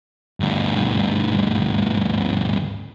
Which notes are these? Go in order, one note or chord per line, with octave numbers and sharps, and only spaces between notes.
D2 G2